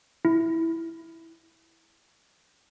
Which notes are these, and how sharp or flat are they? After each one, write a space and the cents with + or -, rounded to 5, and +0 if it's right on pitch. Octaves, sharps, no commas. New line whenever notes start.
E4 -5